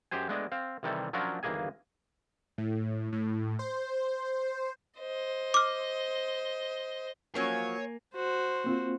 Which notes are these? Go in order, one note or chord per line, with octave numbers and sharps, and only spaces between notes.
F#2 G4 G#4 C5 G#5
G#3 A3 B3 D4 D5 D#5
C4 F5
C3 D#3 E3 G3 A4
F3 F#3 C#4 D4 F4 A#4
G1 D#2 E3 A#3 G#4 G#5
A2
A2
C5
C5 D#5
D6 F6
F3 F#3 A#3 C#4 C#5 G#5
F#4 C5
A#3 C4 F4